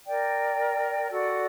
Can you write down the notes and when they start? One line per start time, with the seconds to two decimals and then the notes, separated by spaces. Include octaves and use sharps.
0.06 A#4 D5 G5
1.10 F#4 A4 D5 F#5